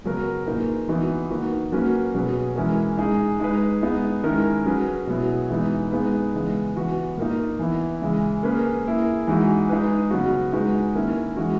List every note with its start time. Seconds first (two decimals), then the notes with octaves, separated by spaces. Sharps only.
0.04 C#3 F#3 B3 F#4 A#4
0.46 A#2 A#3 D#4 G#4 B4
0.89 E3 B3 D#4 F#4
1.30 D#3 A#3 D#4 F#4 B4
1.72 F#3 A#3 C#4 F#4 B4
2.14 B2 F#3 C#4 G#4 B4
2.56 E3 G#3 C#4 E4 A#4
2.97 G#3 D#4 G#4
3.40 G#3 D#4 G#4 B4
3.81 G#3 B3 D#4
4.24 D#3 G#3 C#4 E4 A#4
4.66 F#3 C#4 G#4 B4
5.07 B2 F#3 B3 E4 G#4
5.50 E3 G#3 B3 D#4
5.92 G#3 B3 D#4 G#4 B4
6.34 C#3 E3 G#3 B3
6.76 E3 B3 F#4 B4
7.17 A#2 A#3 D#4
7.59 E3 B3 E4
8.02 C#3 E3 G#3
8.43 A#3 C#4 G#4 B4
8.85 A#3 E4 G#4
9.27 E3 G#3 D#4 F#4
9.69 G#3 D#4 G#4 B4
10.11 C#3 F#3 B3 F#4
10.53 G#3 D#4 F#4 B4
10.95 D#3 A#3 C#4 E4
11.37 E3 G#3 C#4 F#4